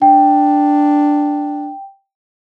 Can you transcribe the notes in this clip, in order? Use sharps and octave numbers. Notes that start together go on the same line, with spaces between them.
D4 G5